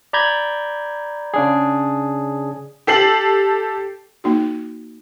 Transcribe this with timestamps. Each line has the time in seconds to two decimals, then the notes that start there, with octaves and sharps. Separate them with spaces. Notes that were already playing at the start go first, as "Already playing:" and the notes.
0.13 D5 A#5 B5 G6 G#6
1.34 C#3 D4 G#4
2.87 G4 A4 C7 F#7
4.24 A#3 D#4 F#4